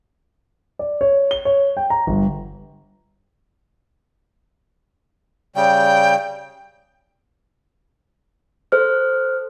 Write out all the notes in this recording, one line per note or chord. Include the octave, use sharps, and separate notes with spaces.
D5
C#5
G7
C#5
G5
A#5
G1
C#3 G3 G5
A4 C5 F6